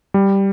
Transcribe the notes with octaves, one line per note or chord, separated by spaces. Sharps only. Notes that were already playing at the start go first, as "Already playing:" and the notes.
G3